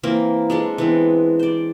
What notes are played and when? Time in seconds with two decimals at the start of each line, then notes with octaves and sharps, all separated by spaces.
0.03 E3 A#3 C4
0.50 G#3 D4 A4
0.78 E3 B3 C4
1.39 C5 D5